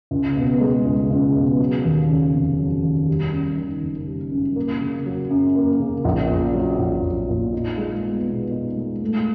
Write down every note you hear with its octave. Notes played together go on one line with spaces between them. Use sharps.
C#2
B2
G#3
C#2
C#2
B2
F#3
D#2
C#3
F1
F#3
D#2
G3
F#2
D#3
F#1
G3
F#2
A#3
C#3
F#3
F#2
A#3
C#3
A#1
A#2
F#3
A#1
A#1
A#2
D#4
G#3
B3
B2
D#4
G#3
A3